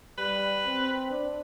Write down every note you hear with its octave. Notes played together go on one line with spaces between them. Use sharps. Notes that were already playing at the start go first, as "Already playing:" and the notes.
G3 B4
C4
D4